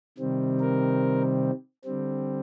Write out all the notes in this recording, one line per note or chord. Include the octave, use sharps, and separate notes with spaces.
C3 D#3 G3 C4
A#4
D3 G3 C4